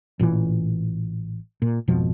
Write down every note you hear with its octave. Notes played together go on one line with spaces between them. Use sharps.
A1 A#2 D#3 E3
A#2
G#1 F2 B2 F3